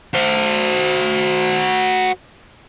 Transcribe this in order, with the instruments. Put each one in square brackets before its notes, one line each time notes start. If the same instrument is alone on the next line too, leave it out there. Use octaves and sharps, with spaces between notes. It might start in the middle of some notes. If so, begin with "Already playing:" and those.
[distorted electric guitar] F#4 C5